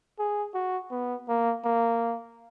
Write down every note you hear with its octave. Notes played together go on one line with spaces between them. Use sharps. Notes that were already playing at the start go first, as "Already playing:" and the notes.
G#4
F#4
B3
A#3
A#3